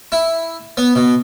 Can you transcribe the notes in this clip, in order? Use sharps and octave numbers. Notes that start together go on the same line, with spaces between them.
E4
B3
B2